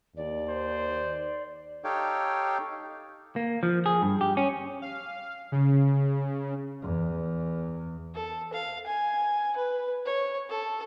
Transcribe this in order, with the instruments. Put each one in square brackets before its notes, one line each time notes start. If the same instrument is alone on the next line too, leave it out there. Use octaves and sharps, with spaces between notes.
[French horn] D#2 [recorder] D5
[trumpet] C5
[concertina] D#4 G4 A4 C#5 F5 G5
[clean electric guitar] A#3
F3
G#4
G2
G4
C#4
[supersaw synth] F5
C#3
[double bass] E2
[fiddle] A4
F5
G#5
B4
C#5
A4